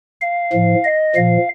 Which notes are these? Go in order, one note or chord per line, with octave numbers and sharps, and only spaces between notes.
F5
A2 F3
D#5
A#2 F3 F5